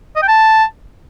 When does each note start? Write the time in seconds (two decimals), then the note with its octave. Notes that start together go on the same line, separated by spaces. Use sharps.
0.16 D#5
0.22 G5
0.28 A5